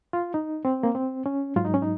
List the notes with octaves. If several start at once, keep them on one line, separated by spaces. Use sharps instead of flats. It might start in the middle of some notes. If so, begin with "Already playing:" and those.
F4
D#4
C4
A#3
C4
C#4
G#2 F#3 F4
D#4
C#4
D#4